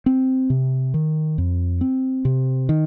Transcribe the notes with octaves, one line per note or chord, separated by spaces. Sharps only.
C4
C3
D#3
F2
C4
C3
D#3